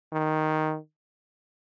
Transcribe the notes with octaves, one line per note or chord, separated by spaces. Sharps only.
D#3